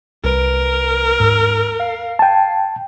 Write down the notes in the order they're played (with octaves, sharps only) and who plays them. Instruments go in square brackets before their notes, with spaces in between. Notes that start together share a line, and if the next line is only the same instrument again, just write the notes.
[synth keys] C2 B4 D7 [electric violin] A#4
[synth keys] D#2 G#2 E6
F5 C7
[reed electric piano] G5 A5